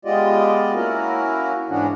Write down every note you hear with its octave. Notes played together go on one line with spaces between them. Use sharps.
G#3 B3 F4 G4 D5 D#5
A#3 C#4 E4 F#4 A#4
G#2 E3 B3 C#4 D4 F#4